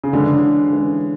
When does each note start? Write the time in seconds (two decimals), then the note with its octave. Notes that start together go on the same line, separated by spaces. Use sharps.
0.04 C#3
0.13 D3 E3 G#3 C#4
0.73 E3 G#3 C#4